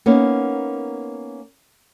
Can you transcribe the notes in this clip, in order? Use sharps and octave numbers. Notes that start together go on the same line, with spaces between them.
A#3 B3 C#4 D#4